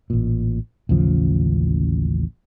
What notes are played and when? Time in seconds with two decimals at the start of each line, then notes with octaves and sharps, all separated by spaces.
0.10 A1 A#2
0.89 A1 D#2 C#3 F3